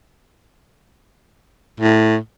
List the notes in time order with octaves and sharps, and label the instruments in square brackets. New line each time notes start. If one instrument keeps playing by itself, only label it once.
[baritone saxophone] A2